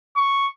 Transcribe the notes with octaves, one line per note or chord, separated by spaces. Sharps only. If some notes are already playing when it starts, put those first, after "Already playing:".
C#6